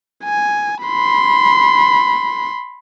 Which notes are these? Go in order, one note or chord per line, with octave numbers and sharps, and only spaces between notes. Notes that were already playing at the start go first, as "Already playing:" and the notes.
G#5
B5 C6